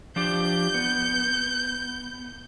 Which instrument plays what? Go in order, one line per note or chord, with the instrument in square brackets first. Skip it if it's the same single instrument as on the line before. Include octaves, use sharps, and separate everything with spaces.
[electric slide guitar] F3 D4 G4 [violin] G6
[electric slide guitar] B3